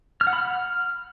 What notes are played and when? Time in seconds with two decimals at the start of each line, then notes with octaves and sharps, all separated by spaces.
0.21 F6
0.27 F#5
0.33 B5
0.39 F6